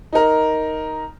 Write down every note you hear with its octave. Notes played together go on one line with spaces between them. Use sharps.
D#4 A#4